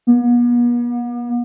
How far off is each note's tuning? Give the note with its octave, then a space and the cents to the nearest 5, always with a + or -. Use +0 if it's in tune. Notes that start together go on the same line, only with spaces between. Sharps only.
B3 -45